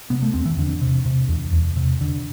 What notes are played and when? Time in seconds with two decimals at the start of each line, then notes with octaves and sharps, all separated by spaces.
0.10 C3 B3
0.23 A3
0.34 E2 C4
0.45 E3
0.58 E2 D3
0.81 C3
1.06 C3
1.29 E2
1.53 E2
1.76 C3
2.01 D3